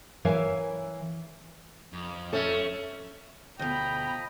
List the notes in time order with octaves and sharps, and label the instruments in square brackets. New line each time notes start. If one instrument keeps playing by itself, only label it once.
[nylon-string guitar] E3 A#4 C#5 E5 F5 G#5
[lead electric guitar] F2
[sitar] A3 C#4 [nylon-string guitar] A4 [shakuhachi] E5
[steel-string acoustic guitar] D2 B2 [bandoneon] F3 D#5 [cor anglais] G5 [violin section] A#5 B5